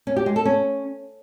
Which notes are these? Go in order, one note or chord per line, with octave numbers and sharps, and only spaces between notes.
C#4
G4
G#3
A4
C#4